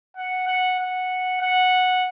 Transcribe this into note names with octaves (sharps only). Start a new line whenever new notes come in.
F#5
F#5
F#5
F#5